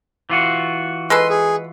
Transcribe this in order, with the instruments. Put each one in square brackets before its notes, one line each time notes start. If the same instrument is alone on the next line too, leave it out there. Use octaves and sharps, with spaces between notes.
[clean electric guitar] E3 F4 F#4
[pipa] G#3 A4 B4 [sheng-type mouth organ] C6
[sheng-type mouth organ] G#4